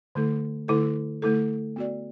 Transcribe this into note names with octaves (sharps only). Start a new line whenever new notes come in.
D3 A3 E4 A4
D3 A3 E4 A4
D3 A3 E4 A4
B3 F#4 D5